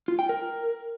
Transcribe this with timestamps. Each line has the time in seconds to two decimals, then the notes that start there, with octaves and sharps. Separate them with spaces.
0.08 F4
0.19 G5
0.29 A#4